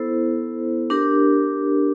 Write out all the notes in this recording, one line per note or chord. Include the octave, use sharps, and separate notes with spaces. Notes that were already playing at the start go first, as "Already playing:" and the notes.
Already playing: B3 E4 A4 C5
D4 G4 A#4